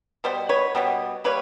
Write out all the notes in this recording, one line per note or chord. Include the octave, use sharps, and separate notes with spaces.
B2 G3 B3 C5
B4 C#5
B2 G3 B3
G3 A#3 B4 C#5